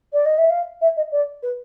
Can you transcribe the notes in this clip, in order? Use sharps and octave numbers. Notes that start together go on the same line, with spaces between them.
D5
D#5
E5
F5
E5
D#5
D5
B4